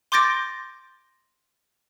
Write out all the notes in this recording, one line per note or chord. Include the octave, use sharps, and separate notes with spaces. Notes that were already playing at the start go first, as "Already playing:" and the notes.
C6 D6 G6 A6 A#6 D7